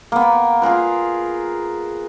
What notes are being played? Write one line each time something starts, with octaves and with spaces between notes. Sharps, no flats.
A#3 B3
F4 G#4 A#4 B4